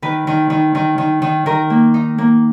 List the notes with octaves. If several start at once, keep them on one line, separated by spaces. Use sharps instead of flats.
D#3 B4
D#3
D#3
D#3
D#3
D#3
D#3 A#4
A#3
D#4
A#3